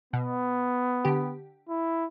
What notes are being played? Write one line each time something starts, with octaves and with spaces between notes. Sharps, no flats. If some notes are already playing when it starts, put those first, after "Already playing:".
B2 B3
D3 G4
E4